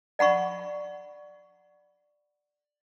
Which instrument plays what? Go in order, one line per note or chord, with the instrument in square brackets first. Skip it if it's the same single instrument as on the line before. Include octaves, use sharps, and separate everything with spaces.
[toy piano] D5 F#5 B5 C#6